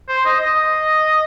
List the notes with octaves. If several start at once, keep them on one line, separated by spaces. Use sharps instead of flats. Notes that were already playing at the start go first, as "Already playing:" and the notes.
C5
D#5
D#5